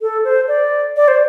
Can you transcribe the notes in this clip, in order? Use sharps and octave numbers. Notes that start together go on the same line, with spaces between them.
A4
C5
D5
D5
C5